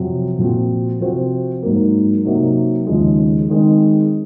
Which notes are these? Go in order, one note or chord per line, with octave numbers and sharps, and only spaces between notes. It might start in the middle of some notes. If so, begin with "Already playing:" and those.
Already playing: F2 C3 F#3 C4
A#2 F3 C4 F#4
C3 F3 C4 F#4 C5
G#2 F#3 A#3
C3 F#3 A#3 D#4
D#2 C#3 F3 G#3
D#3 G#3 C4